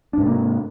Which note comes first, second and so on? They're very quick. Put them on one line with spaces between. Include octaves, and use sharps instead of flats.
D4 G#2 C3 A#3